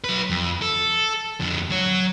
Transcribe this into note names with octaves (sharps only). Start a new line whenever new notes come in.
F#3 B4
F2
A4
F2 D3
F#3 C#5